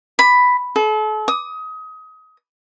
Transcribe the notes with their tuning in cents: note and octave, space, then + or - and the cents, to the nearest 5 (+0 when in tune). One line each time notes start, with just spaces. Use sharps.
B5 +5
A4 -40
D#6 +25